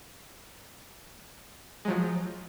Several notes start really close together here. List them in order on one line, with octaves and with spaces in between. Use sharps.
G#3 F#3 F3